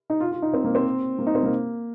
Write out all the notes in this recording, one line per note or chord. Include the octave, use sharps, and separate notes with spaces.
D#4
F4
F4
D#4
C4
A#3
C4
A#3
D#4
C4
A#3